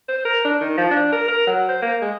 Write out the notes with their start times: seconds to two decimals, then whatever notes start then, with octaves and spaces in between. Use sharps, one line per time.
0.08 C5
0.25 A#4
0.45 D4
0.61 D#3
0.77 F3
0.91 D4
1.12 A#4
1.28 A#4
1.47 F#3
1.69 C5
1.82 A#3
2.02 G#3